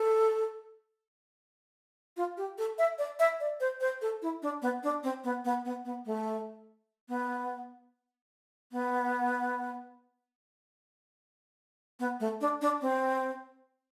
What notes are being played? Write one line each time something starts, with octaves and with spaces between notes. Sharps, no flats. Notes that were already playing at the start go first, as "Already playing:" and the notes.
Already playing: A4
F4
G4
A4
E5
D5
E5
D5
C5
C5
A4
E4
D4
B3
D4
C4
B3
B3
B3
B3
A3
B3
B3
B3
A3
D4
D4
C4